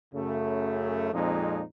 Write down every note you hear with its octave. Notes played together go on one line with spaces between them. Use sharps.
F#2 C#3 A3
F2 A#2 F3 G#3 C4 D#4